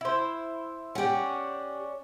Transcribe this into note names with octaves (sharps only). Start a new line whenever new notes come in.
E4 C5
C#4 D4 G4 F#5